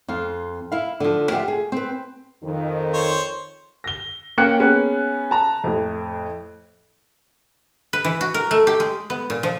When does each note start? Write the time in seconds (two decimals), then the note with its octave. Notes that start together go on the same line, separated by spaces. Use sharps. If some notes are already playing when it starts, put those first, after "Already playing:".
0.08 F2 F4
0.72 E4 F5
1.00 D3 F3
1.30 F4 G4 E5 F#5
1.48 G#4
1.72 C4 B4
2.44 F2 D#3
2.94 C5 C#5
3.84 A#6 G7
4.38 A#3 C#4 G5 F#6 C#7
4.60 B3 C#4 G#4
5.31 A5 A#5
5.64 F2 A2
7.93 B4
8.05 E3
8.21 F#4
8.34 A#4
8.51 A3
8.67 G4
8.80 G#3
9.10 B3
9.30 A#2
9.43 F3